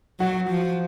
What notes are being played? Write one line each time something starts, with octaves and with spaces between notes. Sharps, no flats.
F#3 F#4
F3